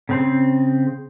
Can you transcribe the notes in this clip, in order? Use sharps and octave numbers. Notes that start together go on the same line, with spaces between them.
C#3 C4 C6